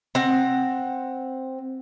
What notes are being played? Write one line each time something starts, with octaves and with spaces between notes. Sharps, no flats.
C4 F#5